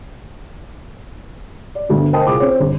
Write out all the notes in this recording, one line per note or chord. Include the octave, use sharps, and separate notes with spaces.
D5
D2 G2 B2 D3
A#4 C5 D#5 G5 A5 D#6
C2 F4 G#4 D6
C4 C5 C#5
G1